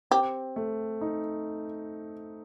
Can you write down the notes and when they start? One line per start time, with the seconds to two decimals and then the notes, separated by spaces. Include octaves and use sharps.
0.11 C4 G4
0.56 A3
1.01 D#4